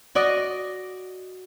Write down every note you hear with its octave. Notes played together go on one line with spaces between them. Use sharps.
F#4 D5 D#5